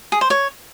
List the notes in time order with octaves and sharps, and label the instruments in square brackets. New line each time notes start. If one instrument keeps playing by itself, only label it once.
[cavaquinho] G#4
C5
C#5